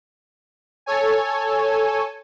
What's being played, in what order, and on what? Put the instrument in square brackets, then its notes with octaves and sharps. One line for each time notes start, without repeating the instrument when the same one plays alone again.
[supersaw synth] A4 C#5 G#5